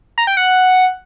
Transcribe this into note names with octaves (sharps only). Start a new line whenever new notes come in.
A#5
G5
F#5